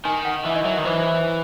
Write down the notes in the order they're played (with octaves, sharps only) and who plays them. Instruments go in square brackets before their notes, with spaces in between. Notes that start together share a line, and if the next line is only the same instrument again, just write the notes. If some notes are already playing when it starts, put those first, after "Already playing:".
[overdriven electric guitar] D#3 [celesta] G#5
[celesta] F#5
[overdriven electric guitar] E3 [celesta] E5
[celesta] D#5
[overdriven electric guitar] F#3 [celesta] E5
[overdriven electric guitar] D#3
[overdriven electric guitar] E3 [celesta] C5